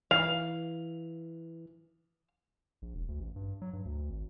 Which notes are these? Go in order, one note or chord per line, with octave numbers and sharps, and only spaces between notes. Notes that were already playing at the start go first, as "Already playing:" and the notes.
E3 F5 F7
A#1
E1
D2
A1
G2
F#3
G2
D2
G#1